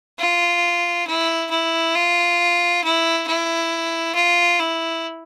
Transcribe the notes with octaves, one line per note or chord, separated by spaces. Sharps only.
F4
E4
E4
F4
E4
E4
F4
E4